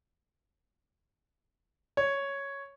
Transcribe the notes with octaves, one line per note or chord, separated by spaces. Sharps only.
C#5